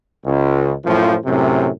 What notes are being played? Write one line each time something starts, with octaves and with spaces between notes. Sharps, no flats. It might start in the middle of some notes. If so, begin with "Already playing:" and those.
C#2
F#2 A2 F3
F#2 A2 C3